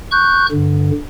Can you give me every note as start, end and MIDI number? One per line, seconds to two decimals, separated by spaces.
0.11 0.46 85
0.11 0.46 90
0.11 0.46 91
0.51 0.91 43
0.51 0.91 50